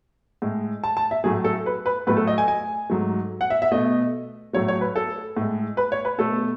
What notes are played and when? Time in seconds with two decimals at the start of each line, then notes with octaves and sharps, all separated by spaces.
0.42 A2 G#3
0.84 A5
0.97 A5
1.11 E5
1.24 A2 F#3 A3 G#4
1.44 A4
1.66 B4
1.86 B4
2.07 A2 F#3 A3 B4
2.17 A4
2.27 D#5
2.38 G#5
2.48 G#5
2.90 G#2 F#3 A3
3.41 F#5
3.50 E5
3.62 E5
3.72 B2 A3 D#5
4.53 A2 F#3 A3 C#5
4.68 C#5
4.81 B4
4.96 A4
5.37 A2 G#3
5.77 B4
5.92 C#5
6.05 B4
6.18 B2 A3 A4